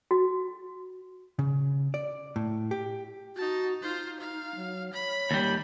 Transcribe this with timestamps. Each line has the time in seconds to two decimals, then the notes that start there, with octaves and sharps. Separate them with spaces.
0.11 F#4
1.39 C#3
1.94 D5
2.36 A2
2.71 G4
3.36 D#4 F#4 A5
3.83 D#4 F4 C5
4.20 F5
4.56 F#3
4.94 C#5 B5
5.31 D#2 G3